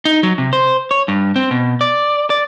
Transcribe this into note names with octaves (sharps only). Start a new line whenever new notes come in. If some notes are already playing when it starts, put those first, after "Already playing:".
D#4
F#3
C3
C5
C#5
G2
C4
B2
D5
D5